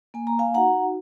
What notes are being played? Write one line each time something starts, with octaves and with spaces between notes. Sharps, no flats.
A#3 G#5
A#5
F5 G#5
D#4 F#4 F#5 A#5